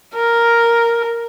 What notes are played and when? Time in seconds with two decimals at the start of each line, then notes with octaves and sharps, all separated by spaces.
0.15 A#4